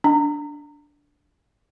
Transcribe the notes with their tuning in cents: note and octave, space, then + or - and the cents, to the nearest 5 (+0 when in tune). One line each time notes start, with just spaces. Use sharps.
D4 -10